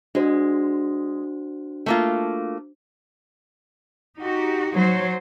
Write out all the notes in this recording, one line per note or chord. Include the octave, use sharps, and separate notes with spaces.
G#3 D4 F#4 C5
A3 A#3 F4
D#4 F#4 G4
F#3 C5 C#5